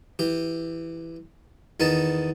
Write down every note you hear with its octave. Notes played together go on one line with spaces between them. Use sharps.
E3 G4
E2 D#3 B3 D#4 A5